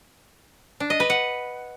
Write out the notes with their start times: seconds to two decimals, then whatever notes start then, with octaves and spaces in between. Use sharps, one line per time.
0.80 D4
0.90 D#5
1.00 B4
1.10 F#5